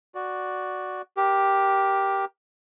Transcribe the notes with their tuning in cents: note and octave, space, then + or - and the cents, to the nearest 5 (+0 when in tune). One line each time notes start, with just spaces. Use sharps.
F#4 +0 D5 +0
G4 +0 A#4 +20